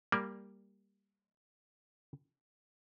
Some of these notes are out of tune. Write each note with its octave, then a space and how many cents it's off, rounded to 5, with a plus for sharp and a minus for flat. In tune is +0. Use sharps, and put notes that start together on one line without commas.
G3 +10 A#3 +0 D5 +0